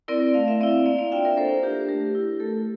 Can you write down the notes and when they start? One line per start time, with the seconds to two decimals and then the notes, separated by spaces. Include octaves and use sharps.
0.08 C4 E4 A#4 D5
0.34 A3 F5
0.48 E5
0.61 C4 E4 D5 F5
0.86 A#3 D5 F5
0.98 D5 F5
1.12 D4 F4 E5 G5
1.25 A#4 D5
1.37 A#3 A4 C5
1.63 D4 F4 G4 A#4
1.88 A3 G4 A#4
2.15 E4
2.40 A3 A4